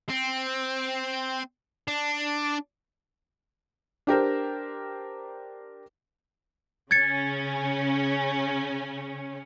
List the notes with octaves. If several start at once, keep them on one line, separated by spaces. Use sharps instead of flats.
C4
D4
D4 G4 A#4 C5
C#3 C#4 G#6 A6 C#7